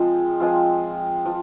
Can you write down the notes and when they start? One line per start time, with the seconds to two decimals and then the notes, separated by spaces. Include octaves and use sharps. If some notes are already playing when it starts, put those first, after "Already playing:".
Already playing: F3 G#3 C4 F4
0.40 F3 G#3 C4 F4
1.26 F3